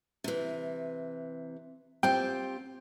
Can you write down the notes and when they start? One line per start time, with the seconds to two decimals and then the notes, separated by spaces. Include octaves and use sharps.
0.24 C3 E3
2.03 C4 F4 G4 G5